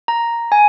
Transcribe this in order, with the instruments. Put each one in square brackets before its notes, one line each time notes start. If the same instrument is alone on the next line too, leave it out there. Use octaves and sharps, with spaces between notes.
[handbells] A#5
G#5